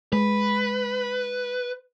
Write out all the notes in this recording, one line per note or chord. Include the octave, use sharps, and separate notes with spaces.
G#3 B4